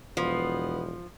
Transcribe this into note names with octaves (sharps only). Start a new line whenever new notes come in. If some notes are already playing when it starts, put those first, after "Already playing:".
E1 F3 B3